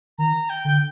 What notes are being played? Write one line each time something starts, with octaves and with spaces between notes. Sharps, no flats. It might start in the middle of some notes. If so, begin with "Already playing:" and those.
D#3 A#5
G5
D3